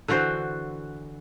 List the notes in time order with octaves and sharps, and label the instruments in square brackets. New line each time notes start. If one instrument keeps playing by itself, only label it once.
[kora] D3 E3 F#4 C5